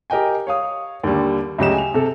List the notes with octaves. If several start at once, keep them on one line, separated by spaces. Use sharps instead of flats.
G4 A#4 D#5 G5 G#5
C#5 F5 D#6
D#2 D3 G3
D2 C#3 F#3 G4 D#5 E7
G#5 F7
C3 A4